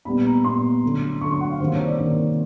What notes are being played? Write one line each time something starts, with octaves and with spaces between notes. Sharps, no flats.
A#2 G3 B3 B5
A#5
A#2 G3 B3 C6
D3 F#3 A3 C#4
D3 F#3 A3 C#4 C#6
C6
F#5
F5
C3 D#3 G3 A#3 C#4 C5
C#5
D5
C3 D#3 G3 A#3 C#4